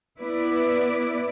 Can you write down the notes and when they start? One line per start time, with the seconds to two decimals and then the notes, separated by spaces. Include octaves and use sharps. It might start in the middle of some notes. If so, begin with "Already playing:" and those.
0.18 B3 E4 B4 D5